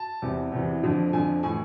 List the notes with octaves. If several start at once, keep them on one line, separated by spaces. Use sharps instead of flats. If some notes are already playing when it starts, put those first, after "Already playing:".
Already playing: A5
E2 C3 E3
E2 C3 E3
F2 D3 F3
F2 D3 F3 G#5
A2 E3 G#5